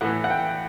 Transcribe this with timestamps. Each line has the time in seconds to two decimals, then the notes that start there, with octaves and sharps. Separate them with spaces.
0.01 A2 E3 F#5
0.24 F#5
0.30 G5